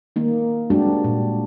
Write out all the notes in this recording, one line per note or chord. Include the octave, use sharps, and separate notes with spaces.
D#3 A#3 D#4
G3 G#3 C4 D4 F#4 G4
A#2